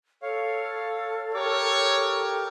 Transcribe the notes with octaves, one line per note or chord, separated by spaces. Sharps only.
A4 C#5 F5
G4 A#4 C#5 D6